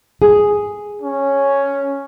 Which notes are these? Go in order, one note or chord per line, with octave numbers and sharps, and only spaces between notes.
G#4
C#4